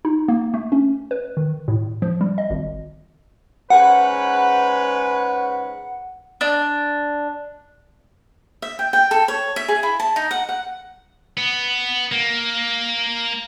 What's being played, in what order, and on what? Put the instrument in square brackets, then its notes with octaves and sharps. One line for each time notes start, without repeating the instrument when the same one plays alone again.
[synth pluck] D#4
A#3
A3
C#4
B4
D#3
A2
F3
G3
D#5
G#1
[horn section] G#2 C#4 B4 [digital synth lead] F#5
[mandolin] D4
[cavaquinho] E5
G5
G5
A4
C#5
E5
G#4
E4
A5
D#4
F#5
F#5
[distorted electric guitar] B3
A#3